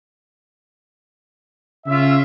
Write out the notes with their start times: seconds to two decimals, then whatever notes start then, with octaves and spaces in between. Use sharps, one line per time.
1.86 C#3 C#4 F4 E5